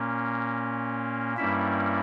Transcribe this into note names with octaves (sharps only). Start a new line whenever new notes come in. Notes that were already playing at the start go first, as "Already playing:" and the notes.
Already playing: A#2 A#3 C#4
G2 G3 A#3 C#4 E4 E5